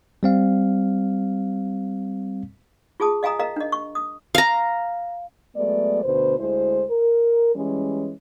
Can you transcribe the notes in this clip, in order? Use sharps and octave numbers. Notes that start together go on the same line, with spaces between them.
G3 C4 F5
F4 G#4 A5 D#6
D#5 F5 G#5 A#5 D#6
A#4 D#5 F5 A#5
D4 D#5
C#6
D#6
F5 A#5
F#3 G#3 A3 B3 D5
D2 B2 D3 B4 C5
D2 G#3 E4 C5
A#4
E3 G3 G#3 C#4